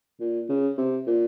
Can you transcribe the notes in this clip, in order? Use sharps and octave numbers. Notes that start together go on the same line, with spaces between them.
A#2
C#3
C3
A#2